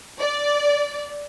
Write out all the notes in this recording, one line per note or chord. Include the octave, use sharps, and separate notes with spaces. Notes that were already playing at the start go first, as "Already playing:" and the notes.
D5